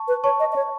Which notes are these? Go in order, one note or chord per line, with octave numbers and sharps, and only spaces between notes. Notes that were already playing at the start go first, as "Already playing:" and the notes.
Already playing: A5 C#6
B4
C#5 A5 C#6
D#5
D#5
C#5